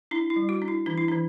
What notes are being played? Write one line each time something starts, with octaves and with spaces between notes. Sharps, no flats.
D4 E4
E4
G3
F#4
D4
E4
E3 D4
E4
E3 D4